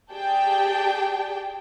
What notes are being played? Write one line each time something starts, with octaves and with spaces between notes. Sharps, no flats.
G4 G#4 D5 G5 A5